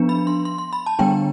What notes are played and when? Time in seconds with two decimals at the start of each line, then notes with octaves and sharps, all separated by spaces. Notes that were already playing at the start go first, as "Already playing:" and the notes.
Already playing: F3 B3 D4
0.09 B5
0.27 C6
0.45 C6
0.58 C6
0.73 B5
0.86 A5
0.99 D3 G3 B3 D4 G5